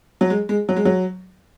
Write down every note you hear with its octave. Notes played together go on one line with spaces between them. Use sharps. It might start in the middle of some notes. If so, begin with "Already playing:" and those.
F#3
G#3
G#3
F#3
G#3
F#3